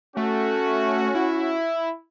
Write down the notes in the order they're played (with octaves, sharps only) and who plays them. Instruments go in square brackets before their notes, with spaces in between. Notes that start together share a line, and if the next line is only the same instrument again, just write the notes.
[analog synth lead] A3 [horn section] C#4 F#4
[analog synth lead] E4